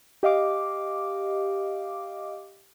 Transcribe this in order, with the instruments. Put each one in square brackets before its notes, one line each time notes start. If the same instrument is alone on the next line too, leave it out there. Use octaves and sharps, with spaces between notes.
[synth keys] G4 D#5 F5 D6